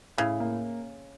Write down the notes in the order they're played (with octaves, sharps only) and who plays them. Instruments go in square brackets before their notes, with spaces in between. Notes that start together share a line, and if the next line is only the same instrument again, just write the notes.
[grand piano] A2 [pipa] C#3
[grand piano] A#3